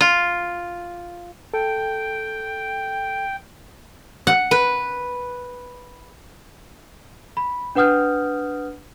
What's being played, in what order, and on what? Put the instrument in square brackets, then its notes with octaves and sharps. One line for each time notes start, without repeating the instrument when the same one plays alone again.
[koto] F4
[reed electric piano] A4 [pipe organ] G5
[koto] F#5
[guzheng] B4
[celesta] B5
D4 B4 F#5 D#6 F6 G6